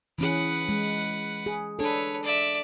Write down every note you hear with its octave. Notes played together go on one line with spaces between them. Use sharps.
E3 C#4 G#4 B4 F#5
G#3
G#4
D4 A4 B4 C#5
D5 E5